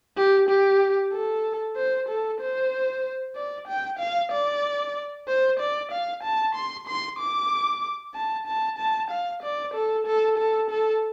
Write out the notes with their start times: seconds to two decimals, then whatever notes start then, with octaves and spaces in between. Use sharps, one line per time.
0.17 G4
0.49 G4
1.13 A4
1.77 C5
2.09 A4
2.41 C5
3.36 D5
3.68 G5
3.99 F5
4.32 D5
5.28 C5
5.59 D5
5.92 F5
6.23 A5
6.55 C6
6.87 C6
7.19 D6
8.15 A5
8.47 A5
8.78 A5
9.11 F5
9.43 D5
9.74 A4
10.07 A4
10.38 A4
10.70 A4